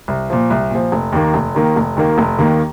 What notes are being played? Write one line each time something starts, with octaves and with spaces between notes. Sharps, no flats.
C2
A#2 F3
C2
A#2 F3
F1
D#2 D#3 A#3
F1
D#2 D#3 A#3
F1
D#2 D#3 A#3
F1
D#2 D#3 A#3